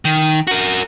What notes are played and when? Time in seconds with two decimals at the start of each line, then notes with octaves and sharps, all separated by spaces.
0.05 D#3
0.47 F#4 A#4